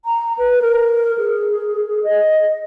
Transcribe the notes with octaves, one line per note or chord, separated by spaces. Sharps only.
A#5
B4
A#4
G#4
D#5